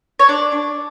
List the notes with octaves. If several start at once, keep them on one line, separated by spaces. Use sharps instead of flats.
C#5
D4 D5
D4